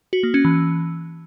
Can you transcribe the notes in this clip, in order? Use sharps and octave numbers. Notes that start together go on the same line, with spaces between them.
F#4
A#3
C#4
E3